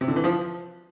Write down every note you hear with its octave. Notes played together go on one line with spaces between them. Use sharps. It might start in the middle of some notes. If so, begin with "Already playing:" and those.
C3
D3
E3
F3